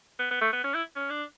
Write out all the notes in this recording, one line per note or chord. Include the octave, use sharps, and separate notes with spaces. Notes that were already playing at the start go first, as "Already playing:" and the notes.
B3
B3
A3
B3
C#4
E4
C#4
D4